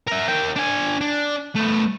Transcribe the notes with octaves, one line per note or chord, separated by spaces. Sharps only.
A#4 E5
A#3 G5
D4 G#5
D4
A3 B3